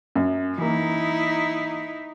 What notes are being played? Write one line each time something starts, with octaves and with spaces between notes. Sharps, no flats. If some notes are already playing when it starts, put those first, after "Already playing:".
F#2
E3 A#3 D#4 E4